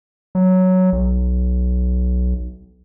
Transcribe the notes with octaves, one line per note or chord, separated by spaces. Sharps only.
F#3
B1